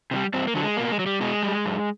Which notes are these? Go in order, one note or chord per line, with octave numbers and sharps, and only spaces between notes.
C3 E3 G3
G2 C4
A#3
D3 F#3
G#3
B2 A#3
G#3
F#3
G3
B2 G#3
G3
F#2